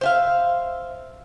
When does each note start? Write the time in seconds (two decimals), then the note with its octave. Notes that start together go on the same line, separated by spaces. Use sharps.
0.01 C5 E5 F5